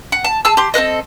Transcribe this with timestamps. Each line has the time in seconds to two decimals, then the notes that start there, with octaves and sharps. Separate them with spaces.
0.12 F#5
0.24 A5
0.45 G#4 A5 E6
0.57 G4 C6
0.74 C4 A4 B4 D#5